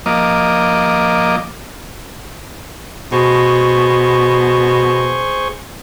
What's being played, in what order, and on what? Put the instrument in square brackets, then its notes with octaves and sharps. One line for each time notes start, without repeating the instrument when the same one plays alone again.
[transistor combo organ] F3 A#3 D#5 D6
[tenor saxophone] B2 [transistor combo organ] G#4 C5 C#6